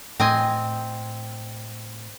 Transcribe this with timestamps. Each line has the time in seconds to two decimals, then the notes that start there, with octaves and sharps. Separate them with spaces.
0.20 A2 C4 D#5 G#5